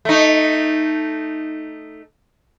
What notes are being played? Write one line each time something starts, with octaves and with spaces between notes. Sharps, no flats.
A3 D#4